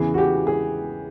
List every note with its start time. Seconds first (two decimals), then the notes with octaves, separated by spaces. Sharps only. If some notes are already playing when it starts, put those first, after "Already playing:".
Already playing: E2 C#3 E3 G#4
0.14 F#4
0.18 G4
0.47 G#4